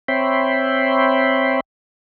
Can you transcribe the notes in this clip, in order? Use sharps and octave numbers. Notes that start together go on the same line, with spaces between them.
C4 C#5 E5 G5 B5 C6